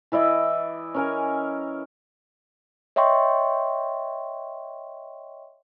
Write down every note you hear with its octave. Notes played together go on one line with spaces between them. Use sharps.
E3 E4 D5 D#5
C#4 A#4 G#5
C#5 D#5 E5 G5 C6 C#6